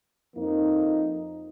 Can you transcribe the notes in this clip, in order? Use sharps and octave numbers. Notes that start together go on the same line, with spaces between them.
F2 F3 A#3 D#4